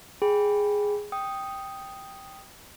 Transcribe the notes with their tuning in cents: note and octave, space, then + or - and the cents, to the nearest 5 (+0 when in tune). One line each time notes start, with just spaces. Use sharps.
G#4 +0 G5 +0 B5 +0
G5 +0 D#6 +0